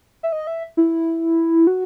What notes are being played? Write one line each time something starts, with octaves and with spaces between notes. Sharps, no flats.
E5
D#5
E5
E4
F#4